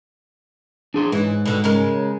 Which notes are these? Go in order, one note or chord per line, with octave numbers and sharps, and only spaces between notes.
D4 G#4 C6
G#2 E3
B2 D3
C#3 G#3 A#4